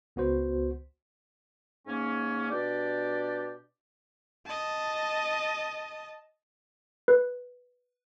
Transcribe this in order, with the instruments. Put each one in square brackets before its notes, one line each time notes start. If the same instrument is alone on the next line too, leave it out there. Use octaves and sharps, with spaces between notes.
[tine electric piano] C#2 B3 F#4 C5
[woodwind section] G#2 A#3 C#4
B2 D4 G4 D5
[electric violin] D#5 A5
[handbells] B4